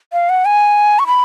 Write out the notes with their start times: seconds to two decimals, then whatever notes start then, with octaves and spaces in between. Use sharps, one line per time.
0.13 F5
0.29 F#5
0.45 G#5
0.99 C#6
1.07 B5